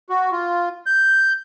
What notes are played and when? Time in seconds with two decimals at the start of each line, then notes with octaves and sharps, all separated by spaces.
0.10 F#4
0.32 F4
0.86 G6